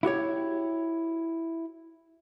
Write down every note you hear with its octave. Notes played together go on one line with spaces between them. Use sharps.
E4 F#4 G4 C#5